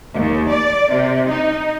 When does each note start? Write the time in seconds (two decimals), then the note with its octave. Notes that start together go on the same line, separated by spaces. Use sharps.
0.16 D#2
0.51 D5
0.91 C3
1.29 D#4